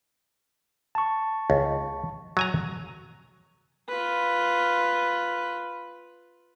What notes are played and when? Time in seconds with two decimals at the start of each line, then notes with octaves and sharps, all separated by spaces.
0.95 A5 C#6
1.50 C#2
2.37 F#3 G#5 A#5
3.89 F4 B4